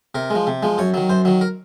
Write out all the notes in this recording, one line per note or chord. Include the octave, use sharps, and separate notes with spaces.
C3 A#4
G#3
F3
C3
F3 G#3
F#2 C#5
D#3 F#3
F#2 C5
D#3 F#3
A#4